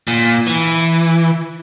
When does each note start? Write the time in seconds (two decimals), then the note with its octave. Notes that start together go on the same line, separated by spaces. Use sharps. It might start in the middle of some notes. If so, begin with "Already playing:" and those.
0.08 A#2
0.47 E3